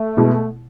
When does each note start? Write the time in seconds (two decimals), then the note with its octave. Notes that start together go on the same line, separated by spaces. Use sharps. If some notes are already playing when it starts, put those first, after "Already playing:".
Already playing: A3
0.17 B2 G#3 B3 E4